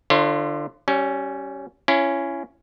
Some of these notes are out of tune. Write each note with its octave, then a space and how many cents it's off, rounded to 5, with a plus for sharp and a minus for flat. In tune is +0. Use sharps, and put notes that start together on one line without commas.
D3 +20 F4 -30 C#5 -40
G3 -25 C#4 +0
C#4 +0 E4 +35